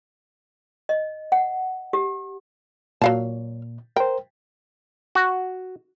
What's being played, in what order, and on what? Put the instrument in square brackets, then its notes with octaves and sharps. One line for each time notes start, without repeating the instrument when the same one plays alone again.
[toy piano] D#5
F#5
G4
[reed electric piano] A#2 [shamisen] F#3 F5 A5
[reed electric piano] A#4 C5 [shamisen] G5
[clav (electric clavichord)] F#4